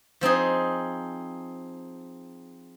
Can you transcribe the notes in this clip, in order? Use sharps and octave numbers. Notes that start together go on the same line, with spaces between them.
F3 C4 D#4 G#4